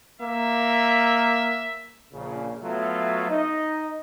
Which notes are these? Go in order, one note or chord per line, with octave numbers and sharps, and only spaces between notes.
A#3 E5
A#1 A#2 C#3
F#3 A3 B3 F4 A4 E5
D#4 D#5